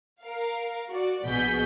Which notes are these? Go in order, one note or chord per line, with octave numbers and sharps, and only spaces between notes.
A#4 F5
F#4 D5
A#1 B2 F#4 G#4 G6 B6